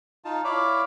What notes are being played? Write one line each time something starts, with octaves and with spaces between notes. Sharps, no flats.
D#4 F4 A5
E4 C#5 D5 F5 B5 D6